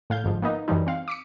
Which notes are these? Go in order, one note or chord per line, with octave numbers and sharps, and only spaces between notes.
A2 F5 G6
G1 G#2 F3
A#3 B3 D#4
F#2 E3 G3 D#4
C4 F5
D6 B6 C#7